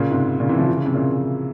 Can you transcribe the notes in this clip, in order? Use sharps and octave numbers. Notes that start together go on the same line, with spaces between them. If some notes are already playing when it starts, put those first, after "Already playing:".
Already playing: A#2 C#3
G#2 C3
A#2 C#3
C3 E3
C#3 F3
E3
C#3
C3
A#2 C#3